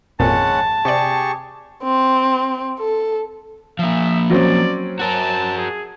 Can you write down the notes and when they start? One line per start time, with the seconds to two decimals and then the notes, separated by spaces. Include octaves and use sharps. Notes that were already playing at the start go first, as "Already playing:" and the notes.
0.20 G#1 F2 A#2 G#3 C#4 F#5 A5
0.85 C3 G4 G#4 D5 C#6
1.84 C4
2.80 A4
3.79 F3 A#3 E5
4.30 F#3 C4 C#4 D5
4.99 F#4 A#4 A5
5.57 G#4